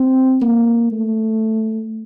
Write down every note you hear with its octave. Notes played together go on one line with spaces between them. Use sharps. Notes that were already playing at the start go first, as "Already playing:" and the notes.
Already playing: C4
A#3
A3